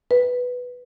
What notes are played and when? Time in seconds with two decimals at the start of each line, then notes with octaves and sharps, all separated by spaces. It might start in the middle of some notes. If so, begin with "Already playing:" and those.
0.11 B4